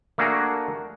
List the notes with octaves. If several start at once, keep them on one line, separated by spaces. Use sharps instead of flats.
A3 A#3 D4 F#4 G#4 A#4